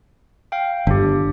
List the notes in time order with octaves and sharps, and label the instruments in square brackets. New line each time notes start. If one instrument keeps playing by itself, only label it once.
[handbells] F5 G5
[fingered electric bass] G1 [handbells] D4 G4